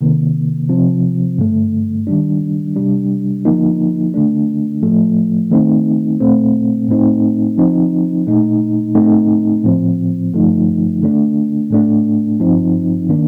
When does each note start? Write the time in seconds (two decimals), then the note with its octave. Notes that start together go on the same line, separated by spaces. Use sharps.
0.01 C3 D#3 A#3
0.69 C3 F3 C4
1.38 G2 D3 A3
2.07 D#3 G3 D4
2.76 C3 G3 D4
3.45 D3 F3 A#3 D#4
4.14 D3 A3 D4
4.82 A2 F3 A3
5.51 D#3 A3 C4 D#4
6.20 A#2 A3 C4
6.88 A2 A3 C4 D#4
7.58 D3 F3 C4 D#4
8.27 A#2 A3 D#4
8.95 A2 A3 C4 D#4
9.64 A2 F3 C4
10.33 G2 D3 F3 A3 D#4
11.02 D3 A3 D4
11.71 A2 A3 D4
12.40 G2 F3 C4 D#4
13.09 D#3 A#3 D4